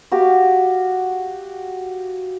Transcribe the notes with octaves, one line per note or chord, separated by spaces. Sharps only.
F#4 G4 F5